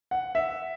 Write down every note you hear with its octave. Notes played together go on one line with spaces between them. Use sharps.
F#5
E5